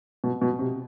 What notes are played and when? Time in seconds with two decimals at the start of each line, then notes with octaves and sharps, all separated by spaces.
0.24 B2
0.42 B2
0.59 C3